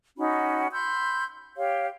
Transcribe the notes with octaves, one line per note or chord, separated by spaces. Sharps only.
C#4 D#4 F#4 B5
B5 C6 E6 G6
G4 C#5 F5